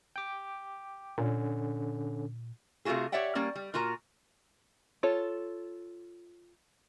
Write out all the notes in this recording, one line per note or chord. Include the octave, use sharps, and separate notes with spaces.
G5 D6
A#2 D3 C#4
C3 A3 D4 F4 F#4 G#4
G4 C#5 D5 E5 F#5 G5
G3 A#3 C#4 D5
G3
A#2 F4 F#4 A#4 A#5
F4 A4 C#5